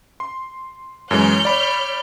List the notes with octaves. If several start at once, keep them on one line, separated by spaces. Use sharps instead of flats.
C6
F#2 E3 G#3 C#5 F6 G6
D5 B5